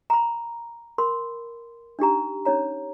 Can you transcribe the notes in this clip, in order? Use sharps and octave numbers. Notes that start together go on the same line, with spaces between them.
A#5 B5
A#4 B5 C6
D4 D#4 G4 A#5
C#4 D#4 C#5 A#5